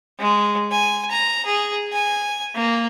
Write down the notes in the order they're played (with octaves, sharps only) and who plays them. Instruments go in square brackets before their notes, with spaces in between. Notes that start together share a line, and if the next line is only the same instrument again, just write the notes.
[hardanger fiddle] G#3
G#5
A#5
G#4
G#5
A#3